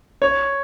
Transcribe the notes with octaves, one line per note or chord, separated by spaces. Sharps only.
C#5